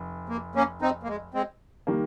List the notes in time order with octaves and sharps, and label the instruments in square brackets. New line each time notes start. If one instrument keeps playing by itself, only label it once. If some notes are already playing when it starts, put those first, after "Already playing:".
Already playing: [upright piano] F1
[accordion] A#3
A#3 C#4
C4 D#4
A#3
G#3
G#3 C4
[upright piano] D#3 G3 A#3